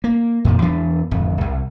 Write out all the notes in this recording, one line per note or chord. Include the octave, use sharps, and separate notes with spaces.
A#3
F2 A#2 D#3
E2 E3 B3 D4
D1 G#1 F2
C2